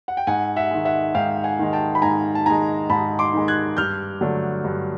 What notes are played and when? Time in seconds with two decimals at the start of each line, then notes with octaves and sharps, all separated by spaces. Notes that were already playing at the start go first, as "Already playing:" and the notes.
0.08 F#5
0.17 G5
0.27 G#2 F#5 G#5
0.56 E5 F#5
0.71 D#3 G#3
0.85 E5 F#5
1.14 G#2 F5 G5
1.44 F#5 G#5
1.59 D#3 G#3
1.73 G5 A5
1.95 B5
2.02 G#2 G#5 A#5
2.35 A5
2.46 D#3 G#3 G#5 A#5
2.89 G#2 A5 B5
3.19 C6 D6
3.34 D#3 G#3
3.48 F#6 G#6
3.77 G2 F6 G6
4.21 D3 F#3 A3 D4
4.64 G2